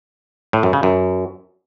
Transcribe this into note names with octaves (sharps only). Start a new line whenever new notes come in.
A2
F#2
C#3
F#2